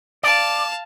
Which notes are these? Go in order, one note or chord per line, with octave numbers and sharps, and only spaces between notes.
D5 F5 A5